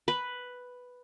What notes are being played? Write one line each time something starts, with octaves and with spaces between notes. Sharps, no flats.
B4